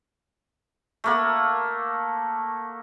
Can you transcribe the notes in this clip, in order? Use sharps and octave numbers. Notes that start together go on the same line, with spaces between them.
A3 A#3 F#5